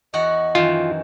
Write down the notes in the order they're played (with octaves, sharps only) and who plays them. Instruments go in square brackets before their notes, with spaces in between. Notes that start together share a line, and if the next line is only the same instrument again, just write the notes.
[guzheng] E2 F#4 F#5 [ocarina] D#5
[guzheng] F#2 D#3 E3 [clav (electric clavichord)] F4